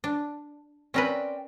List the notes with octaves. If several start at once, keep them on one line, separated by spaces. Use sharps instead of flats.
D4
C4 C#4 A#4 B4 D5 G5